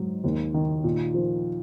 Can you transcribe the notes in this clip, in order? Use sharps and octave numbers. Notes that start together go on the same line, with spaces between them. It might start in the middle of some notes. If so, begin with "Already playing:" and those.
Already playing: G#2 F#3
D#2
D#3
A#2
F3